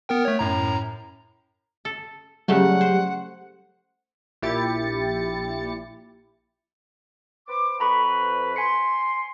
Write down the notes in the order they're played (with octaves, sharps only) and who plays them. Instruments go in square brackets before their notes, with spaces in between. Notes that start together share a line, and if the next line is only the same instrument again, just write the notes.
[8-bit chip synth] B3 A#4 G5
A3 C#5
F#2 A2 A#5
[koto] A4
[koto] C#3 A3 [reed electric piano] F#3 G4 [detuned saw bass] G3 [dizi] F#5
[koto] C5
[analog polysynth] A#1 A#2 E4 G4 A6 C#7
[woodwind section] B4 C5 D6
[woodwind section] F2 B4 [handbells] A#5 B5 C#6
[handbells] G#5 B6 C#7 [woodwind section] C6